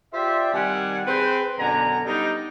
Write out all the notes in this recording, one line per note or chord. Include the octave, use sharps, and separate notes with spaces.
F4 G4 C5 D5 E5
C3 D#3 G3 F#5 G#5
C4 G#4 B4 C5
F#2 B2 D3 D4 G#5 A#5
G3 B3 D4 D#4